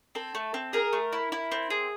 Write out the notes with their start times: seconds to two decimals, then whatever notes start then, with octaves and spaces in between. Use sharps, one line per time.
0.15 C4 A4
0.35 A3
0.54 C4
0.73 G#4 A#4
0.93 A3
1.12 E4
1.32 E4
1.52 C4
1.70 G#4